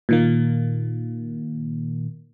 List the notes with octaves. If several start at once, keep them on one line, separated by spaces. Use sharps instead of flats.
A#2 D#3 A#3